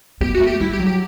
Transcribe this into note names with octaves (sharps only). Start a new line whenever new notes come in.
B3 G4
F#4
A3
G4
G3 E4
G4
F#3
G4